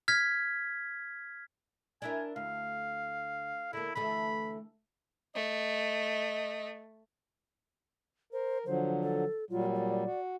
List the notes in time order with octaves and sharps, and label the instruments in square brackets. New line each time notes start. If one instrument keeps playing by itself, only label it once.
[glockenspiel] F6 G#6 B6
[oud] D4 E4 A#4 [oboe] G#5
[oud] D2 [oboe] F5
[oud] D3 A#3 [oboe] E4
[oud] D2 E3 A3 [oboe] B5
[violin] A3 [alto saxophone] D#5
[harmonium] A#4 [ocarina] C5
[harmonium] D3 F3 F#3 [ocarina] C5
[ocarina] A4
[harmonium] A#2 F#3 G3 [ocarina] F4
[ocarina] D5
[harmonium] F#4